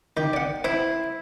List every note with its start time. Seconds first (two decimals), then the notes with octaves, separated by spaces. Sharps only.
0.17 D#3 G4
0.33 D5 F#5
0.64 E4 C5 G5